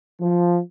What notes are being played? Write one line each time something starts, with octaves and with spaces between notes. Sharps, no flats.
F3